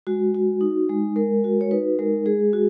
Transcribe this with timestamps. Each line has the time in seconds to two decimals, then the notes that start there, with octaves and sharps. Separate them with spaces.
0.07 G#3 F#4
0.35 F#4
0.61 D#4
0.89 G#3
1.16 G#3 A#4
1.44 F#4
1.61 C#5
1.71 D#4 B4
1.99 G#3 A#4
2.26 G#3 G#4
2.53 F#4